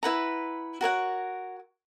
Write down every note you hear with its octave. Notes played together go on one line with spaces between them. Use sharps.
E4 B4 F#5 A#5
F#4 A#4 C#5 F#5